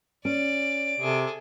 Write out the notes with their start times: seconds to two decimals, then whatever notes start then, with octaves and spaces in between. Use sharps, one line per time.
0.25 C#4 D5 D7
1.00 C3 G#4 A4